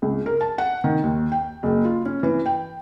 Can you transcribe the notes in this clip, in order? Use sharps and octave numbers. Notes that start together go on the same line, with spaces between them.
C#2
A#4
A5
F#5
D#3
D#2
G5
F#1
F4
C#4
E3
G5